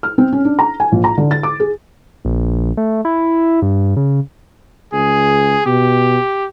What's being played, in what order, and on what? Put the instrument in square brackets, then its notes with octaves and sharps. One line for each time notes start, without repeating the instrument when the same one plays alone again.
[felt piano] F6
C4
C#4
D4
A#5
G#5
A#1
A#5
D3
A6
D6
G#4
[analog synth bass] A#1
A3
E4
G2
C#3
[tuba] C#2 [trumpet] G#4
[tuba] B2 [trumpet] G4